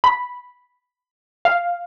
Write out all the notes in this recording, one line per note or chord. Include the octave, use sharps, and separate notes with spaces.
B5
F5